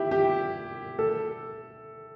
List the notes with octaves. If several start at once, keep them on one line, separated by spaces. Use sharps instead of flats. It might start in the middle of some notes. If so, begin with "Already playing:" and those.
Already playing: E4 G4
G4
A4